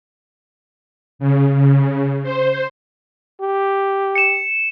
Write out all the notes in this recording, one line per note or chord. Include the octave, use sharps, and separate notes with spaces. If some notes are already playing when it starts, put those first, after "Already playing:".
C#3
C#3
C5
G4
C#7 E7